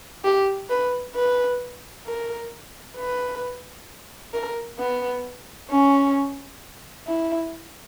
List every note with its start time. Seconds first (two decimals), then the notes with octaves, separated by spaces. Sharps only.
0.24 G4
0.69 B4
1.15 B4
2.06 A#4
2.97 B4
4.34 A#4
4.79 B3
5.70 C#4
7.07 E4